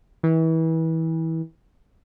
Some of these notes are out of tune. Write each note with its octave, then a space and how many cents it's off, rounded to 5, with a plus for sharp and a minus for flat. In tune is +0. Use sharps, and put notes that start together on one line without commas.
E3 -30